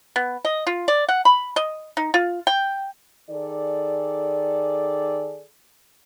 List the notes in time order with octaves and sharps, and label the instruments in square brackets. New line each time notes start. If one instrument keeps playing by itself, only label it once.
[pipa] B3
D#5
F4
D5
F#5
B5
D#5
D#4
F4
G5
[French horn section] D#3 G#4 A4 D5